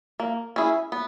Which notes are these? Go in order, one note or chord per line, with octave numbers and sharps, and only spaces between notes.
A#3
C#4 E4 G#4
B3